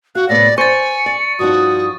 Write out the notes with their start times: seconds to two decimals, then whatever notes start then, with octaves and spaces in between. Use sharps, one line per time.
0.15 F#4 F5 F#6
0.29 A2 C3 B3 D5 A#6
0.58 C5 G#5 C#6 A6 C#7
1.06 D5
1.39 G2 F3 D#4 F#4 D#6